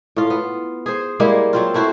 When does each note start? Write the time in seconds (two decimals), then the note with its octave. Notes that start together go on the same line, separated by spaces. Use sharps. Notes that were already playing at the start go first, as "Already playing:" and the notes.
0.16 A2 F4
0.30 B3
0.86 G#4 C5
1.20 G3 G#3 A#3 E4
1.53 F#3 C4 F4
1.74 A3 E4 F#4 C5